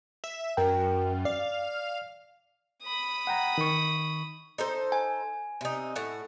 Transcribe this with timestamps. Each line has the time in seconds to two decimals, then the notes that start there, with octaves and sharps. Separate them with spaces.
0.24 E5
0.57 F#2 A#4 G5
1.25 D5 F5
2.83 B5 D#6
3.27 F#5 G5 A#5
3.58 D#3 C#6
4.58 D#4 A4 C5
4.92 G#5
5.61 C3 D#4
5.96 A2 F#5